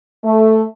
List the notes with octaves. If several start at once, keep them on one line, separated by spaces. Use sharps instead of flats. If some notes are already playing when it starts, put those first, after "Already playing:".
A3